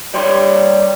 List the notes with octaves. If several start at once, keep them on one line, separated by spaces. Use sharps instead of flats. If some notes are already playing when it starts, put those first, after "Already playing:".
G3 G4 C#5 C6